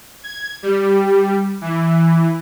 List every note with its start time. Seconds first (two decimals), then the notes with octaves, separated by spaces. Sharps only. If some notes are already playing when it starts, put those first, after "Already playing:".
0.23 G#6
0.63 G3
1.61 E3